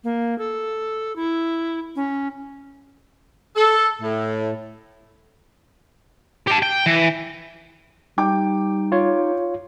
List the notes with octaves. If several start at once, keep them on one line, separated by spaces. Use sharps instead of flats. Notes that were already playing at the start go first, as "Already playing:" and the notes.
A#3
A4
E4
C#4
A4
A2
G4 A5
G5
E3
G3 D#4 G5 D6
F4 C#5